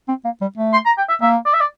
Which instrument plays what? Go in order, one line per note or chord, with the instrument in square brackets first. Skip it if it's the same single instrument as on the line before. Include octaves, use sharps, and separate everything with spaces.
[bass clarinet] C4
A#3
G3
A3
[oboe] C6
A#5
G5
E5
[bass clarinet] A#3 [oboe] E5
[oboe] D5
E5
D5